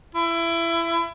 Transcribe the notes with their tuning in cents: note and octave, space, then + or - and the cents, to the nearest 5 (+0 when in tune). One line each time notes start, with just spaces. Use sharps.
E4 +25